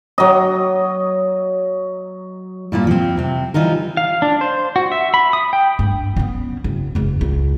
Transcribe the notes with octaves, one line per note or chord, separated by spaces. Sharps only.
F#3 D#5
G2 A#2 G3 A#3
F3 C4
C3 C4
E3 F3 G3 D#4 A#4
F5
D4
C5
F#4
E5
B5
D#6
G5
G2
B3 C#4
F#1
F#1 E2
C#2